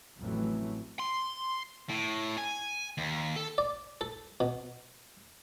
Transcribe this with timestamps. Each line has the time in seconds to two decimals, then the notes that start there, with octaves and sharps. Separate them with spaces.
0.19 A1 F2 A2 E3 F#3 A3
0.99 C6
1.89 A2
2.38 G#5
2.98 D#2
3.36 A4
3.58 D5
4.01 A4
4.40 B2